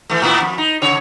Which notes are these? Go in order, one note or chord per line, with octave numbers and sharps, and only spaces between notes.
E3 A3
A2 B3 E4
F2
D#4
C#3 C#5